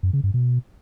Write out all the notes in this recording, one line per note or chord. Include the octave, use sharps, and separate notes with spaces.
F#2
C#3
G2
B2